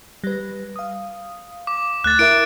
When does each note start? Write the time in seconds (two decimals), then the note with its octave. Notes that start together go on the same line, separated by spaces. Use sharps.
0.24 G3 B4
0.76 F5 D#6
1.67 D6
2.04 D2 A3 F#6 A6
2.19 E4 A#4 E5 D7